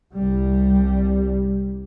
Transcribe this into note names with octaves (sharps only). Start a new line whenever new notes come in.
C2 G3